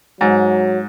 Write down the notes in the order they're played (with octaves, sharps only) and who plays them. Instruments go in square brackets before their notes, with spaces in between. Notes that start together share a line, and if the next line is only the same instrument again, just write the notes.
[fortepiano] G#2 [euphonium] F#3